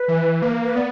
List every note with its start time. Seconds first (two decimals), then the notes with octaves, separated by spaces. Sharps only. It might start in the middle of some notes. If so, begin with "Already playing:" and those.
Already playing: B4
0.08 E3
0.42 A#3
0.65 B4
0.76 B3 D5